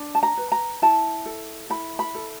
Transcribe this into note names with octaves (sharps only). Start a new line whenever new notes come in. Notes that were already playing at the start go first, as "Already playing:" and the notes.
Already playing: D4
A5
A#5
B4
A#5
E4 A5
A4
E4 B5
B5
A4